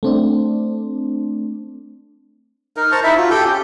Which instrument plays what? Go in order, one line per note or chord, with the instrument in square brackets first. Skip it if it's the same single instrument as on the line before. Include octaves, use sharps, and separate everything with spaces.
[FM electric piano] A3 C4 D4
[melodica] D#4 A#4
C5 A5 A#5 C#6
D#4 E4 E5
F4 F#4
G4 A4 G5
C#4 G4